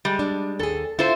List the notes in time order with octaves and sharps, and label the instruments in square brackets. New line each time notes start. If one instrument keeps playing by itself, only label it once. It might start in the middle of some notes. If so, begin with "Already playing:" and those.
[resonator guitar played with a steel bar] G3 G#3
[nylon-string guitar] D4
[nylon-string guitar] D#2 G#4 [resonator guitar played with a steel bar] A4
[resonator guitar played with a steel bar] E4 A4 C5 [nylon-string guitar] F4